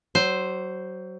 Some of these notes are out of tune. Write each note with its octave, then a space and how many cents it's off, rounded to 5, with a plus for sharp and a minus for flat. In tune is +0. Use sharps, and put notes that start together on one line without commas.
F#3 +25 C5 +0